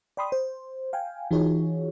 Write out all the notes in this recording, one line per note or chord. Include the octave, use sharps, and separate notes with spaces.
D5 G5 B5 C6 D#6
C5
F5 G5 G#5
E3 D#4 F4 F#4 G#4 C#5